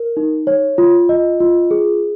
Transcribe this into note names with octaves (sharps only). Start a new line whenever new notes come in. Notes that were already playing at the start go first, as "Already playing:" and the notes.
Already playing: A#4
D#4
C#5
F4
D#5
F4
G#4